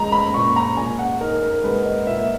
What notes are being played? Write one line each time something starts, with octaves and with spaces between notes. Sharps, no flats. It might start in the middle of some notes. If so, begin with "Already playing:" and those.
Already playing: A#2 G#3 C#4 A#5
B5
A#2 C#6
A#5
A#2 G#5
F#5
D#4 A#4
A#4
G#3 B4
D#5
A#2 E5